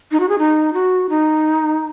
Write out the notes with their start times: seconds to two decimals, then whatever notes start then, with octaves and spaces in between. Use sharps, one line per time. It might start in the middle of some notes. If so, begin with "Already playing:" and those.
0.12 D#4
0.20 F#4
0.29 G#4
0.39 D#4
0.73 F#4
1.09 D#4